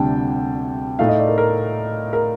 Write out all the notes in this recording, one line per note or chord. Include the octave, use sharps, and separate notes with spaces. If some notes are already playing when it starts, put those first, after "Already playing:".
Already playing: D2 C3 G3 D4 G5 A5
A2 A3 D#4 F5
D#5
D5
A#4
A#4
A#4